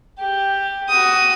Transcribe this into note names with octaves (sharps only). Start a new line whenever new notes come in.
G4
F#4 D#6